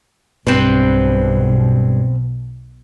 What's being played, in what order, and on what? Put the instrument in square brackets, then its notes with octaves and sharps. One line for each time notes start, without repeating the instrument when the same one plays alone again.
[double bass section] B1 B2 [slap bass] G2 [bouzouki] C4 B4